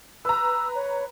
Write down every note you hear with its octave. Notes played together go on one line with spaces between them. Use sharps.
B4 A#5 E6
C#5